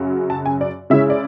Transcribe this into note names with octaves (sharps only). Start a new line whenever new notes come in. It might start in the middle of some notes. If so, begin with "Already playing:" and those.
Already playing: F#2 C#3 F#3
A5
G#5
D5
C#3 G#3 C#4 E4 E5
D5